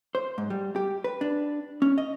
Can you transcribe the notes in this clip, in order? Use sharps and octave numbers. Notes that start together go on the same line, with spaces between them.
C5
G#2
G3
G4
B4
D4
C#4
D#5